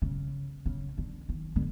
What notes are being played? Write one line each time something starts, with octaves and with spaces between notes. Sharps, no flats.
C#3
C#3
D3
D#3
D3